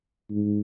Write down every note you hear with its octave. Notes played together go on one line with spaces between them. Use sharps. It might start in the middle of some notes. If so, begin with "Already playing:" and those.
G#2